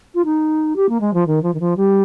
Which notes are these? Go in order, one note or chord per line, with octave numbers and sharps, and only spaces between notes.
F4
D#4
G4
A#3
G#3
F3
D#3
F3
D#3
F3
G3